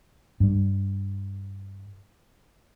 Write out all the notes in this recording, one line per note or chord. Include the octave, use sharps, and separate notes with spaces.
G2 G3